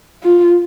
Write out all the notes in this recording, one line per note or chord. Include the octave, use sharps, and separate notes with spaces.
F4